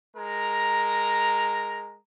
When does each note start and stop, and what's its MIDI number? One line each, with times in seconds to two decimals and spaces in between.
0.17 1.97 56
0.17 1.97 70
0.17 1.97 82